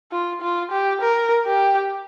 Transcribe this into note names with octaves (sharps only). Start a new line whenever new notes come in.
F4
F4
G4
A#4
G4